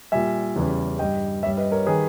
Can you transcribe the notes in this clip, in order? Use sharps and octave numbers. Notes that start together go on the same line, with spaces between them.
A#2 G3 E5 G#5
E2 C#3 E3 G3
G2 G3 D#5 G5
G2 G3 C#5 E5
B4 D#5
A#4 C#5
D#3 G3 G#4 B4